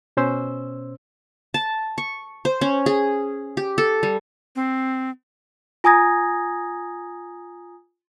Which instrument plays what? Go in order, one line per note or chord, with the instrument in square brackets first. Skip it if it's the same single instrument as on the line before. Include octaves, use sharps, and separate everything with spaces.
[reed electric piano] B2 C#4 C5 E6
[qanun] A5
C#6
C5
C#4
G#4
G4
A4
G3
[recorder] C4
[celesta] F4 G#5 A#5 D#6 G#6 A#6